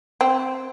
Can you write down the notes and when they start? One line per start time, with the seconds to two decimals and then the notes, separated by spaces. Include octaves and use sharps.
0.21 C4